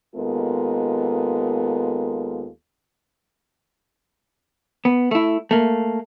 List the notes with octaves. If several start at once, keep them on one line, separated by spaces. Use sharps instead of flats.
D#2 G#3 B3 F4 A4 A#4
B3
A3 E4
A3 A#3